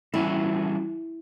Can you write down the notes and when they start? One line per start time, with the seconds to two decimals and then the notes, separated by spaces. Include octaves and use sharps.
0.14 E3 G3 C#4 E4 F#4